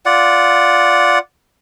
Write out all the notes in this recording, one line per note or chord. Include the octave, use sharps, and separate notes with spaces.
F4 D5 F#5